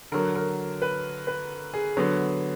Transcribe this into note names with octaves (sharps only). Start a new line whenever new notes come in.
D3 F#3 A#4
A#4
B4
B4
G#4
D3 F#3 B3